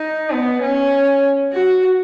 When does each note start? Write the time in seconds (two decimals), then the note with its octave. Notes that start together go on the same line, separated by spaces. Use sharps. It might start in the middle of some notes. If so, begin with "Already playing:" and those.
Already playing: D#4
0.31 B3
0.62 C#4
1.53 F#4